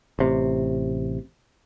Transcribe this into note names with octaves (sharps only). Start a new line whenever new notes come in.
A1 C3